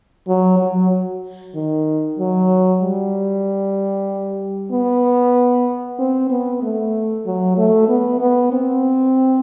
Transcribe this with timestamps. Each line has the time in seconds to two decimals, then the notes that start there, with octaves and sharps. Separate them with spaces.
0.28 F#3
0.59 F#3
1.55 D#3
2.18 F#3
2.82 G3
4.72 B3
5.99 C4
6.30 B3
6.62 A3
7.26 F#3
7.57 A3
7.89 B3
8.21 B3
8.52 C4